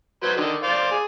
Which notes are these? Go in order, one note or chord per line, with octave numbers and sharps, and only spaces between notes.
F#3 B4 C5
D3 D#3
C5 D5 F5
G#4